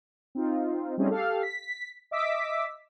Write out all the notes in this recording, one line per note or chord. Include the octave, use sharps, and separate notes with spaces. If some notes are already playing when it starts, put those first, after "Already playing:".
C4 D#4 F4
G3 A3 C4 C#4 D#4 G#4
G4 A4 F5
B6
D#5 E5 D6 E6 B6